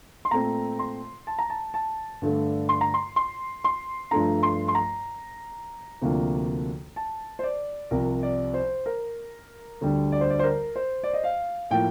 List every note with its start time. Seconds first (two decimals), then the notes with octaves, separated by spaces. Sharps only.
0.25 C6
0.31 A#2 A3 C4 A#5
0.79 C6
1.27 A5
1.39 A#5
1.50 A5
1.74 A5
2.22 G2 D3 A3
2.69 C6
2.81 A#5
2.94 C6
3.16 C6
3.64 C6
4.11 G2 F3 A3 D4 A#5
4.43 C6
4.68 C6
4.75 A#5
6.02 D2 C3 F3 A#3 D4
6.96 A5
7.39 C5
7.43 D5
7.91 C2 C3 F3 A#4
8.23 D5
8.54 C5
8.86 A#4
9.81 D2 D3 G3 D4
10.12 D5
10.21 C5
10.30 D5
10.39 C5
10.43 A#4
10.76 C5
11.03 D5
11.13 D#5
11.24 F5
11.70 A2 F3 A#3 G5